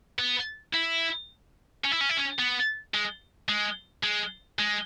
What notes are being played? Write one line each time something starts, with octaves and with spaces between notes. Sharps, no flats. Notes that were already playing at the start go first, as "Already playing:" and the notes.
B3
E4
C#4
E4
C#4
E4
C#4
B3
G#3
G#3
G#3
G#3